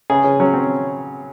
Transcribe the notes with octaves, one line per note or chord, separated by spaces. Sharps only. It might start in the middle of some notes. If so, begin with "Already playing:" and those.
C#3 G#4
C#3
F#3 C#4
C4